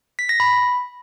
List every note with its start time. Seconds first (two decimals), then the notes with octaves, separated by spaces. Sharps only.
0.19 B6
0.29 A#6
0.40 B5